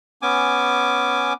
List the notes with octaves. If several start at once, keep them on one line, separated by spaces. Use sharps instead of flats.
B3 C#4 G#5 D6